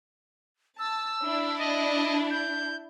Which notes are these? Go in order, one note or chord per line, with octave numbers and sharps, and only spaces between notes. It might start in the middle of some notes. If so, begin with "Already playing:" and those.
A5 E6
D4 E4
D#5
G6